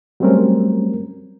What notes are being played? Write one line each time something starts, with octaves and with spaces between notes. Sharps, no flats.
F#3 G3 A3 C4 C#4 A#4